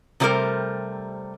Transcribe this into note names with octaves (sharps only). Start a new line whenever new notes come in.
C3 F#3 G3 A3 A#4 C5